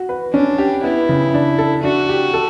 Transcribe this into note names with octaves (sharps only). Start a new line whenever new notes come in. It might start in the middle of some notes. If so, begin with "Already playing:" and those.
Already playing: F#4
B4
C#4 D4
G4
B3 E4
C#3
D4
A4
D4 F#4
G4
A4